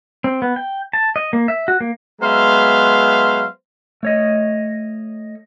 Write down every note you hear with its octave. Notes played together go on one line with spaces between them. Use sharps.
C4
B3
G5
A5
D#5
A#3
E5
F#4
A#3
F#3 G#3 B3 C5 E5 F5
A3 C#5 D#5